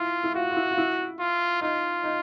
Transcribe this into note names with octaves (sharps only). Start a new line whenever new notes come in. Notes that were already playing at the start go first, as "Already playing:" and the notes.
Already playing: E4 F4
E4
F4 F#4
F4
E4
F4
E4
F4
D#4 F4
D#4